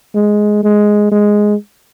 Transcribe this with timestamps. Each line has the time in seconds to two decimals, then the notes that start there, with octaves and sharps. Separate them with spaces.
0.15 G#3
0.63 G#3
1.11 G#3